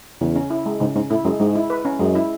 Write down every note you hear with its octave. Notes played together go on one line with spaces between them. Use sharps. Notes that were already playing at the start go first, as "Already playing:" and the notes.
E2 C#3
C#4
E4
G#3
G#2 C#3
G#2 C#4
A2 E4
F#2 G#3
G#2 G#3
E4
B4
C#4
F#2 G#3
E4